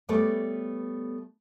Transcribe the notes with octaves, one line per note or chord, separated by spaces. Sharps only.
G3 A3 B3 C#5 D5